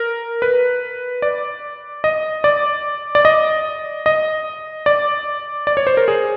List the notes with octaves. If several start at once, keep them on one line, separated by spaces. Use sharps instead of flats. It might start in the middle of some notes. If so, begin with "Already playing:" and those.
Already playing: A#4
B4
D5
D#5
D5
D5
D#5
D#5
D5
D5
C#5
C5
A#4
G#4